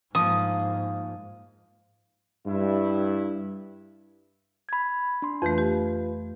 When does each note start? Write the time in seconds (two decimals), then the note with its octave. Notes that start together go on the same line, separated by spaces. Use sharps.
0.15 G#2 F3 A#3 D#6
2.46 G2 E4
4.69 B5 G#6
5.22 D4 C6
5.42 F2 E3 A3 F4 B4
5.58 G4